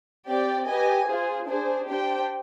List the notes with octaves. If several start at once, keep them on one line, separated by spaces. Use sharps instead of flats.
C4 G4 D5 G5
G4 B4 D#5 G#5
F4 G#4 C5
D4 G#4 C5
D4 G4 C5 G5